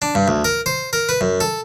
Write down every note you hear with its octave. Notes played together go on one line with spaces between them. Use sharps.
D4
G2
D2
A#4
C5
A#4
B4
F#2
A4